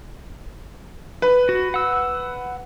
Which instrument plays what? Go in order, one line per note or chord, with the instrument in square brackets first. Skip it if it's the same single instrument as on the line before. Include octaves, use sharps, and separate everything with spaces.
[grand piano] B4
[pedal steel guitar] F#4
F#5 E6